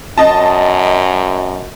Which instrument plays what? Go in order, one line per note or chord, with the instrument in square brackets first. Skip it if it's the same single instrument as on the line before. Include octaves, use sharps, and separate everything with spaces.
[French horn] F#2 [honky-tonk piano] D#5 A5